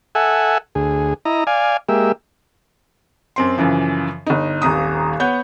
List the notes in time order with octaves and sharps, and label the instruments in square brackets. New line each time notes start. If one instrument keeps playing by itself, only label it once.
[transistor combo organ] A4 E5 F#5 G#5
D2 G#4
E4 D#5 A#5
D5 F5 G#5
G#3 A#3 G4 E5
[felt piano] F#2 C4 C6
F#2 C#3 E3 F3
G1 D#4
D#1 G#1 A#5 D#6
B3 C#5 F#5 G6